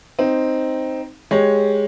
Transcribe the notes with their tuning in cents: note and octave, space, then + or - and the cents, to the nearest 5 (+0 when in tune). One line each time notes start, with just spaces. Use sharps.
C4 +0 D#4 +0
G#3 +0 G4 +0 C#5 +0